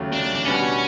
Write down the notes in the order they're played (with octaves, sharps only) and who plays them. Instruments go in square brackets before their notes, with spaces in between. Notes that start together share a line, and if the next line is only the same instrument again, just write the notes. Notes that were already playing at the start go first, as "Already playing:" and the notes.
Already playing: [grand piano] D#2 C#3 F#3 A3
[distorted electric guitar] D4
D4
[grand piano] B2 G3 B3 D4 F#4 [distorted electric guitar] C#4